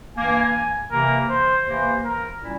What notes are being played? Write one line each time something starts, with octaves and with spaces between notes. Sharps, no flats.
G2 E3 A#3 G#5
C3 E3 A#3 A#4
C5
C3 E3 A#3 C5
A#4
A#2 G3 C#4 E4